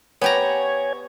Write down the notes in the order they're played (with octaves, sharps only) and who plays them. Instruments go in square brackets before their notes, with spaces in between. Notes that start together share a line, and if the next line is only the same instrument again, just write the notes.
[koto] B3 G4 A#5 [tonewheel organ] C#5 G#5